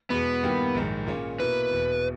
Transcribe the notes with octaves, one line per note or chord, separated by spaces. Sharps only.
E2 B2 G#3 B3
G2 D#3 A#3 E4 G4
A#1 G#2 D#3
A#2 A#3 C#4 G#4 C#5
B2 A#3 E4 B4
E1 E2 B2